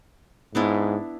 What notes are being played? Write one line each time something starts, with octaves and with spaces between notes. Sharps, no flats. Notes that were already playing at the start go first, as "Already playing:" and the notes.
G#2 B3 D4 E4